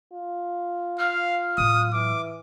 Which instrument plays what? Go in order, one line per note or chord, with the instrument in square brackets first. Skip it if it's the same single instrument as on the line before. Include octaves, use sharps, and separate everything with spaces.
[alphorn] F4
[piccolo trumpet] F5 [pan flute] F6
[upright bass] A2 F#3 [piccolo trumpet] D#6
[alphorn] E3 [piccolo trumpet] D6